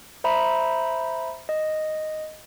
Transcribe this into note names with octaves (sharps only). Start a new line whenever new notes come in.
C5 E5 A#5 B5
D#5